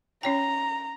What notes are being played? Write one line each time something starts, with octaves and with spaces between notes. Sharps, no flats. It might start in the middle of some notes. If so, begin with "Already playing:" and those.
C#4 C#5 G5 A#5